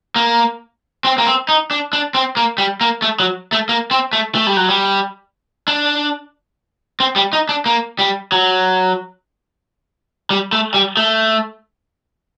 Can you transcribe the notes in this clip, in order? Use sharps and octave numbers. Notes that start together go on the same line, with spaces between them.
A#3
C4
A#3
C4
D#4
D4
D4
C4
A#3
G3
A#3
A3
F#3
A3
A#3
C4
A3
A3
G3
F#3
G3
D4
C4
G3
D#4
D4
A#3
G3
F#3
G3
A3
G3
A3